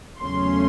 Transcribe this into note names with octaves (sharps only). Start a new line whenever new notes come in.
E2 C#3 F#3 A3 C#4 C6